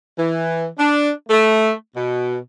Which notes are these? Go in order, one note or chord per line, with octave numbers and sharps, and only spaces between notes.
E3
D4
A3
B2